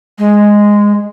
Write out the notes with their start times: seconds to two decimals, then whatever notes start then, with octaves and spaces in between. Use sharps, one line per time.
0.19 G#3